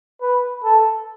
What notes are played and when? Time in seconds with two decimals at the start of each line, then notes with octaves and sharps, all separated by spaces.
0.22 B4
0.64 A4